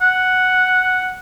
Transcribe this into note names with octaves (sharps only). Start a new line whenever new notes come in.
F#5